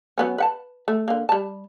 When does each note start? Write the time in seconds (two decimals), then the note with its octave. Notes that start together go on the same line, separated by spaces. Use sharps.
0.18 F#3 B3 C#4
0.38 B4 F#5 A5
0.88 A3
1.08 D3 A#3
1.29 G3 A5